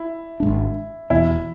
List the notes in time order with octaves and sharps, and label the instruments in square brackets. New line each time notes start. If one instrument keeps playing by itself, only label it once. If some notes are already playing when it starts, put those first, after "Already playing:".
Already playing: [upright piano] E4
[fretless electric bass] G#1 G#2 G#3 D4
[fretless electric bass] E1 E2 B2 [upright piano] E4